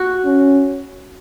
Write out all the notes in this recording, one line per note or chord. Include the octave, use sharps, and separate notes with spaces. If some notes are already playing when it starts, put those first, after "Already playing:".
Already playing: F#4
C#4